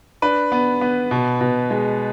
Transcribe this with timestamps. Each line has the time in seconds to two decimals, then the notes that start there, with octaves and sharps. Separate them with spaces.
0.22 D4 B4
0.52 B3
0.81 B3
1.11 B2
1.41 B2
1.71 G#3